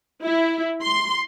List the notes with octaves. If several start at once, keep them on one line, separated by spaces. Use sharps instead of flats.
E4
C6